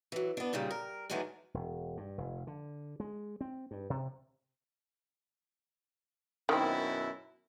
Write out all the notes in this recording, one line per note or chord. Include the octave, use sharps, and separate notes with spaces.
E3 F#3
B3 D4
D#2 A#2 C#3 G3
A#4
D#3 E3 F#3 G#3 A3 D4
E1
G2
F1
D3
G#3
C4
G2
C3
F#2 B2 D#3 C4 E4